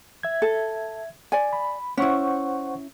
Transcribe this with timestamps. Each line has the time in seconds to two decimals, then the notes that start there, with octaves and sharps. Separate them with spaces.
0.23 E5 G#6
0.42 A4
1.32 D5 G#5
1.53 B5
1.97 C#4 E4 C5 F#5 C#6